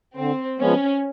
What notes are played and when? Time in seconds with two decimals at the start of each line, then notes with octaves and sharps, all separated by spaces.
0.17 D3 C4
0.59 F3 G#3 B3 C#4